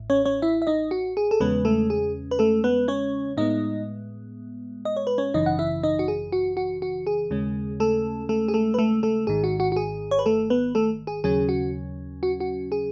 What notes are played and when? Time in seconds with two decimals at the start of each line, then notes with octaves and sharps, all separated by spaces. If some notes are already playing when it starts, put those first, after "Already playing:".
Already playing: A1 A2
0.10 C#4 C#5
0.25 C#4 C#5
0.42 E4 E5
0.62 E5
0.67 D#4 D#5
0.91 F#4
1.17 G#4
1.31 A4
1.40 E2 C#3 G#3 B3 C#4 B4
1.65 A3 A4
1.90 G#4
2.31 B4
2.39 A3 A4
2.64 B3 B4
2.88 C#4 C#5
3.37 A2 G#3 B3 D#4 D#5
4.85 D#5
4.97 C#5
5.07 B4
5.18 C#4 C#5
5.34 G#1 F#2 C#3 E3 D#4 D#5
5.46 F#5
5.59 E4 E5
5.83 D#4 D#5
5.99 F#4
6.08 G#4
6.32 F#4
6.57 F#4
6.82 F#4
7.07 G#4
7.31 D#2 C#3 G#3 C#4
7.80 A3 A4
8.29 A3 A4
8.48 G#4
8.54 A3 A4
8.74 B4
8.79 A3 A4
9.03 A3 A4
9.27 G#1 G#2 D#3 G#4
9.44 F#4
9.60 F#4
9.72 F#4
9.76 G#4
10.11 C#5
10.19 B4
10.26 A3 A4
10.50 B3 B4
10.75 A3 A4
11.07 G#4
11.24 D#2 C#3 F#3 C#4 G#4
11.49 F#4
12.23 F#4
12.40 F#4
12.72 G#4